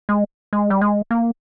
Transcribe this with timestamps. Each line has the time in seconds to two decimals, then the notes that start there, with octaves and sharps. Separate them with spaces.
0.09 G#3
0.53 G#3
0.70 G3
0.81 G#3
1.11 A#3